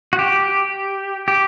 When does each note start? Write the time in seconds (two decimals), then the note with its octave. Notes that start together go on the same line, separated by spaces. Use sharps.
0.13 F#4
0.19 G4
1.28 G4